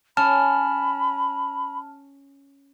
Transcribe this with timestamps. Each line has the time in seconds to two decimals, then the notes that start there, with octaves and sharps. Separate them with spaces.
0.17 C#4 A5 B5 F6